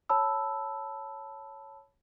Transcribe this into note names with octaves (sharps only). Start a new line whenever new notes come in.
C#5 A5 B5 E6